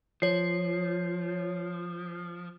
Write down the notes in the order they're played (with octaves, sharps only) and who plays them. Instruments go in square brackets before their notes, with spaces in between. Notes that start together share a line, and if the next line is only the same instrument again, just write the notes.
[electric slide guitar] F3 [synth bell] C#5 C7